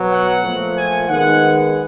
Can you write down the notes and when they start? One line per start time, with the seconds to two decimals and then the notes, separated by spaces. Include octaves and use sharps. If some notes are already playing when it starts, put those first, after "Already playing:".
Already playing: B2 F#3 B3
0.10 F#5
0.42 A#2 F3 A3
0.77 G#5
1.09 D#3 G#3 B3 F#5